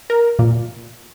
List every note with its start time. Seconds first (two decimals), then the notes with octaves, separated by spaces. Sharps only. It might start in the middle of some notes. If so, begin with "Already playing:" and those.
0.10 A#4
0.39 A#2